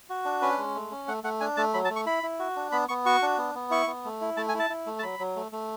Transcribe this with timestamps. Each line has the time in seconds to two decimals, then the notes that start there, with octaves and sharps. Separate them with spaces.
0.09 F#4
0.25 D4
0.42 C#4 B4
0.58 G#3
0.75 A3
0.91 C#4
1.08 A3 F#5
1.24 A3 F#5
1.40 D4 G#5
1.57 A3 A5
1.74 F#3 B5
1.85 A5
1.90 A3
1.96 C#6
2.06 E4 B5
2.23 E4
2.39 F#4
2.56 D4
2.72 B3 B5
2.89 B3 C#6
3.06 F#4 C#6
3.22 D4
3.38 B3
3.55 B3
3.71 E4 C#6
3.87 B3
4.05 A3
4.21 E4
4.37 A3 A5
4.49 G#5
4.54 E4
4.60 A5
4.70 E4
4.86 A3
4.99 A5
5.03 F#3 B5
5.19 F#3
5.36 A3
5.52 A3